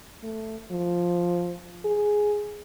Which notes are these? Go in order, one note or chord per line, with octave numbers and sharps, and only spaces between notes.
A3
F3
G#4